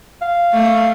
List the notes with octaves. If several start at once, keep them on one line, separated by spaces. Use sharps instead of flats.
F5
A3